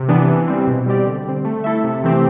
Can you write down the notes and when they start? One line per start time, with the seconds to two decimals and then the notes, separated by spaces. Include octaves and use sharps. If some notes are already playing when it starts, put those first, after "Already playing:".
Already playing: C3
0.09 E3 B3 D4
0.28 E3
0.48 G3 C4
0.67 B2
0.86 G3 C4 G4 D5
1.06 D3
1.26 G3 C4
1.45 A3
1.64 E4 A4 E5
1.84 C3
2.04 E3 A3 C4 G4